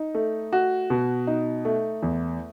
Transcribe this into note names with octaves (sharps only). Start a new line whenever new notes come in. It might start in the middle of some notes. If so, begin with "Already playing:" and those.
Already playing: D#4
A3
F#4
B2
D#4
A3
E2